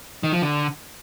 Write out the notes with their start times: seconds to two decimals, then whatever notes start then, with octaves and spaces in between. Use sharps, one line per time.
0.23 D#3
0.33 F3
0.42 D3